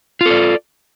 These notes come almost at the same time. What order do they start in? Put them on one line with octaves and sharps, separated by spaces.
F4 A4 D5